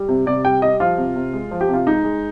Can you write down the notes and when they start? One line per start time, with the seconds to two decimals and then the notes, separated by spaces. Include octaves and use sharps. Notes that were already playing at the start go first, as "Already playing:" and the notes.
Already playing: G3
0.09 C3
0.26 C3 D5
0.45 G3 G5
0.62 G3 D#5
0.80 F3 F4
0.97 C3
1.16 C3
1.33 G#3
1.51 F3
1.61 G4
1.69 C3 F4
1.87 G#3 D#4
2.04 G#3